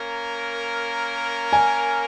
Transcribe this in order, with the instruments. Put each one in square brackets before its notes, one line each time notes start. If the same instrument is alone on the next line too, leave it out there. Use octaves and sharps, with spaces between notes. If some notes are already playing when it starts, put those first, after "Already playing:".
Already playing: [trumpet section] A#3 C#4 A#4
[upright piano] G#5